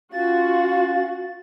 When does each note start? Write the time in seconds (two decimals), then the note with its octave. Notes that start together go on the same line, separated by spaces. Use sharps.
0.13 C#4 F4 F#4 F5 A6